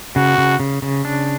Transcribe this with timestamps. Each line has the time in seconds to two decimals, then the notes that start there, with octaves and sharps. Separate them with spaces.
0.16 C#3 F#4
0.38 C#3
0.60 C#3
0.82 C#3
1.05 D4